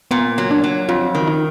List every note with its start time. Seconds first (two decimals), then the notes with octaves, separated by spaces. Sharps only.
0.11 A#2 B3
0.38 F#3
0.51 D4
0.64 F#3
0.89 F2 F4
1.15 D#3
1.28 D#4